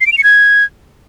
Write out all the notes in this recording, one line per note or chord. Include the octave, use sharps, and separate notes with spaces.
C7
D7
F7
C#7
G#6